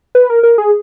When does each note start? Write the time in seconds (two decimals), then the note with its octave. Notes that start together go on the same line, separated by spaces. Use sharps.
0.15 B4
0.30 A#4
0.43 A#4
0.58 G#4